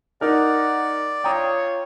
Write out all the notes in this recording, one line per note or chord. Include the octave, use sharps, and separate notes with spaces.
D#4 A#4 D5 F#5
F4 C#5 G5 A#5 D#6